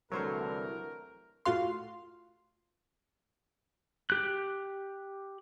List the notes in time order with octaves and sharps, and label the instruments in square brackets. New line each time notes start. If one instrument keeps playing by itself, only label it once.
[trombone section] C2 D3 E3 [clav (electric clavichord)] F#3 [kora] A3 C5 C#5 [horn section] A#4
[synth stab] A2 F4 F#4 F5 C6
[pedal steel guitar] G4 F#6